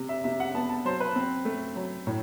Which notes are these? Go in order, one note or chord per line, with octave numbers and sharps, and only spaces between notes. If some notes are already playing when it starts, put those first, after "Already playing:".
Already playing: C3
E5
C3 E5
F#5
B3 A5
A5
F#3 C5
B4
C4
A3
F#3
A2